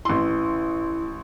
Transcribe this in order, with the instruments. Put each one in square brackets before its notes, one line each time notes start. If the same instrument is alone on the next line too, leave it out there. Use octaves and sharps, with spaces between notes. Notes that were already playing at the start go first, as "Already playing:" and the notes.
[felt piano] A1 C6 [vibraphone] E4